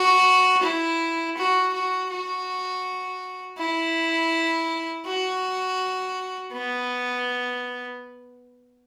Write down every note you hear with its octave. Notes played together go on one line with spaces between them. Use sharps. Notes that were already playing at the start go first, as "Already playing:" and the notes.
Already playing: F#4
E4
F#4
F#4
F#4
E4
F#4
B3